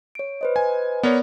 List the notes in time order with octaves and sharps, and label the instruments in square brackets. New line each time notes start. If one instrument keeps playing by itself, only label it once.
[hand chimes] C#5 D7
B4 C5 D#5
[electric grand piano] G#5
[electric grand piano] B3 A#4 C#5 [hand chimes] D5